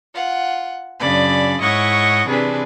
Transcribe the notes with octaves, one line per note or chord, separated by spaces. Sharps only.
F4 F#5
F#2 C#3 D4 D5 B5
G#2 E4 C#5 D#5 F#5 C#6
C3 E3 D4 G#4 B4